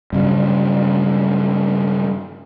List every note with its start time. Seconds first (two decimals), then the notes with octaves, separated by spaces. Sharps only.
0.13 G2 C#3 F#3